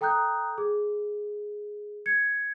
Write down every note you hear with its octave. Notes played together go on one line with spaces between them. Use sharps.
A4 G5 A#5 D#6 F#6 G6
G#4
G#6 C#7